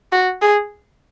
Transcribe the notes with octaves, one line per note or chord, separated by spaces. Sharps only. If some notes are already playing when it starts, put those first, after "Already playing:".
F#4
G#4